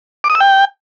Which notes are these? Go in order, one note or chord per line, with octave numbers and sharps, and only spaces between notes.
D6
D#6
E6
G5